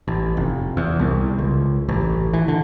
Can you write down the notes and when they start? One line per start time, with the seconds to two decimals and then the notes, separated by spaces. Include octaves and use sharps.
0.08 A1
0.37 F1
0.77 E2
0.99 C2
1.39 C#2
1.89 A1
2.34 E3
2.48 D3